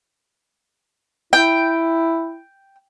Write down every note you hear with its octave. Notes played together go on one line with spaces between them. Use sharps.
E4 G5